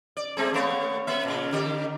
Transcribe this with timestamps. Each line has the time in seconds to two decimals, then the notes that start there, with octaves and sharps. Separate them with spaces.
0.17 D5
0.37 G#3 C4 G#4
0.53 A3 B3 C#5
1.07 A#3 E5
1.25 A#2 C#3
1.52 D3 G4